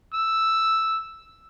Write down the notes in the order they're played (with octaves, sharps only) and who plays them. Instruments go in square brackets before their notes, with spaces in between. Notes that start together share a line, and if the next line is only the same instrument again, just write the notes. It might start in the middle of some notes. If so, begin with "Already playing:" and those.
[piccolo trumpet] E6